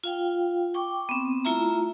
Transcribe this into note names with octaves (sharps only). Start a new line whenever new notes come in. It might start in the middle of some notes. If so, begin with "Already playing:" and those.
F4 F5 G5
G5 C#6 D6
B3 C4
A3 E4 F4 E5 A#5